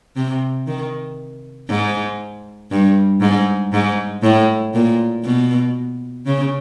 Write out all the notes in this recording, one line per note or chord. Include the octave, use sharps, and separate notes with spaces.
C3
D#3
G#2
G2
G#2
G#2
A2
A#2
B2
C#3